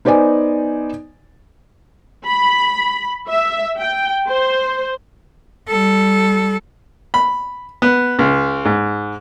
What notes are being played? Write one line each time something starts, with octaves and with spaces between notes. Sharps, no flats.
B3 D#4 C5 D5 G#5
B5
E5
G5
C5
G3 A4
B5
B3
C#2
G#2